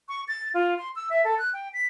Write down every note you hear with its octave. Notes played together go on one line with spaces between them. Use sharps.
C#6
A6
F4
C6
E6
E5
A4
F#6
G5
B6